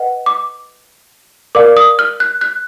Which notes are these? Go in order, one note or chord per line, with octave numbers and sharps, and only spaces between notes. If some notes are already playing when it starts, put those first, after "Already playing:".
Already playing: B4 D#5 F#5
D6
A#4 D5 F5 D6
D#6
F6
F#6
F#6